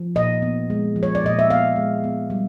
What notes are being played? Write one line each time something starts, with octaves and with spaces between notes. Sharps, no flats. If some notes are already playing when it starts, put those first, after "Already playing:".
Already playing: F3
A#2 D#5
B3
G#3
F3
C#5
D5
A#2 D#5
E5
B3 F5
G#3
B3
G3